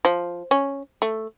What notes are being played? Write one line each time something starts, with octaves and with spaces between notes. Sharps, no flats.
F3
C#4
A3